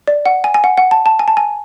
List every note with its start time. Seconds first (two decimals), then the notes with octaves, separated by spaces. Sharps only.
0.08 D5
0.26 F#5
0.44 G#5
0.54 G#5
0.64 F#5
0.77 F#5
0.91 A5
1.06 A5
1.19 G#5
1.28 A5
1.37 G#5